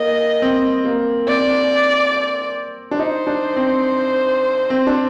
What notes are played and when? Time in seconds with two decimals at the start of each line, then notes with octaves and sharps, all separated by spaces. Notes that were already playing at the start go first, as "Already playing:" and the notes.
Already playing: A#3 D#5
0.42 C4
0.85 A#3
1.28 C4 D5
2.91 D4
2.99 D#4 C5
3.27 D4
3.57 C4
4.70 C4
4.87 D4